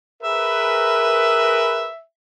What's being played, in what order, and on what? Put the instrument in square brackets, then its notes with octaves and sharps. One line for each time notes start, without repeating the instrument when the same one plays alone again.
[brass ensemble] G#4 A#4 B4 [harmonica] E5